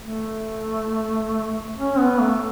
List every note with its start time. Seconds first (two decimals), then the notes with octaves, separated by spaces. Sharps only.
0.02 A3
1.77 C#4
1.98 B3
2.20 A3